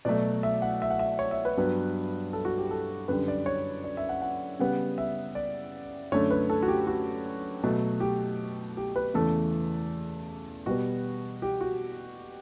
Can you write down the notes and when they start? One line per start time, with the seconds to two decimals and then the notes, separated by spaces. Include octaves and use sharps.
0.05 B2 F#3 A3 D5
0.43 E5
0.62 F#5
0.82 E5
0.90 F#5
0.99 E5
1.19 C#5
1.31 E5
1.45 B4
1.57 G2 F#3 B3
2.33 A4
2.45 F#4
2.58 G4
2.71 A4
3.08 F#2 D3 G3 B4
3.28 D5
3.46 C#5
3.84 D5
3.97 E5
4.09 F#5
4.22 F#5
4.59 C#3 G3 B3 F#5
4.98 E5
5.35 D5
6.12 F#2 D3 A3 C#5
6.30 B4
6.50 A4
6.62 F#4
6.68 G4
6.87 F#4
7.63 B2 F#3 A3
8.00 G4
8.77 G4
8.96 B4
9.14 E2 C#3 E3 A3 A4
10.66 B2 G3 B3 F#4
11.42 G4
11.61 F#4